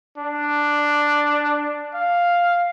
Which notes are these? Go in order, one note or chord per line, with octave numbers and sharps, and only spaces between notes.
D4
F5